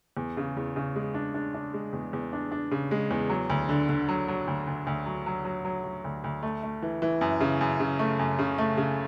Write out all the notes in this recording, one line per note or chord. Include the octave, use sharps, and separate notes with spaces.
E2
C#3
E2
C#3
G#3
D4
D4
D4
G#3
E2
E2
D4
D4
C#3
G#3
E2
F#3
D2
D3
D3
F#3
F#3
D2
D2
D2
F#3
F#3
F#3
F#3
F#3
D2
D2
A3
A3
E3
E3
F#2
C#3
F#2
C#3
A3
F#2
C#3
A3
C#3